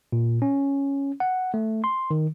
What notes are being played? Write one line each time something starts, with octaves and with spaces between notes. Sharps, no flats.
A#2
C#4
F#5
A3
C6
D#3